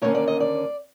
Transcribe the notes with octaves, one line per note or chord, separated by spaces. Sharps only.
D#2 D3 G3 A#3 C#4 C#5
D5
D#5
D5